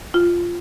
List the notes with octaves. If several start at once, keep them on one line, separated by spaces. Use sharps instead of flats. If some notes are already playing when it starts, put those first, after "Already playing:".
F4